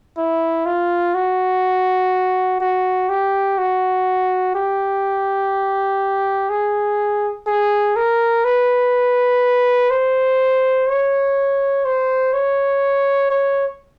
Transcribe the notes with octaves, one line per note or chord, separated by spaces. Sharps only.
E4
F4
F#4
F#4
G4
F#4
G4
G#4
G#4
A#4
B4
C5
C#5
C5
C#5
C#5